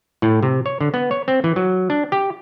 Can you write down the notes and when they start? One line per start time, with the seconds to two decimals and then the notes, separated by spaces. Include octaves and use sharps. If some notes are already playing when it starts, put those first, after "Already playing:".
0.22 A2
0.43 C3
0.66 C#5
0.81 D3
0.94 B3
1.11 C#5
1.28 C4
1.44 E3
1.56 F#3
1.90 D4
2.12 G4